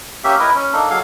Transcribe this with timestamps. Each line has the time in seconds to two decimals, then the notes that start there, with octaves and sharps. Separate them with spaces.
0.24 A#3 C#4 G4 E5
0.40 E4 A#4 B4 D#5
0.55 C#4
0.73 A#3 D4 D#4 A4
0.90 F#3 G#4 A4 F5